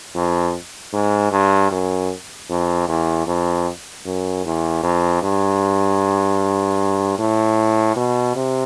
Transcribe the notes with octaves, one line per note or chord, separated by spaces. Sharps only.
F2
G#2
G2
F#2
F2
E2
F2
F#2
E2
F2
G2
A2
B2
C3